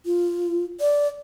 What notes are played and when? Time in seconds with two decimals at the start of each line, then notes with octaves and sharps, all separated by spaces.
0.06 F4
0.80 D5